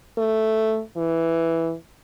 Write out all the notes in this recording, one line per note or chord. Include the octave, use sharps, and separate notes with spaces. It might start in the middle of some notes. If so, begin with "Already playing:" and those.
A3
E3